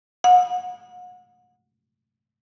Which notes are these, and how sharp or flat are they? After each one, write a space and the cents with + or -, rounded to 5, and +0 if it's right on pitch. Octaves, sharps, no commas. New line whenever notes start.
F#5 -40